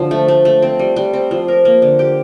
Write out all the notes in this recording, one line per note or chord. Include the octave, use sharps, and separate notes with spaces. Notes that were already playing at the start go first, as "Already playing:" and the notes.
Already playing: D3 F3
A3
A3
A3
C4
G3
G3
C4
F3
A#4
A#3
D3
G4